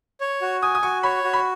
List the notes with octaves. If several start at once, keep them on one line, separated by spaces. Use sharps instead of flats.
C#5
F#4
G#5 D#6
D#6
F#4 C#6
C#5 B5
F#4
B5